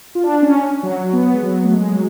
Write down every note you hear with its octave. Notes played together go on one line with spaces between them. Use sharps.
F4
D4
C#4
F#3
B3
G#3
F#3
A3
G#3
F#3